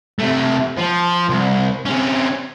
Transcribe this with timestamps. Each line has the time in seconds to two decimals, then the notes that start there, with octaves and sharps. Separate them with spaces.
0.19 C3 A3
0.77 F3
1.29 C2
1.86 C3 C#4